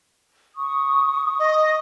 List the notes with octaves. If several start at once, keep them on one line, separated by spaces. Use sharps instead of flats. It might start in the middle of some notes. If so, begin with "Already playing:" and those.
C#6 D#6
D#5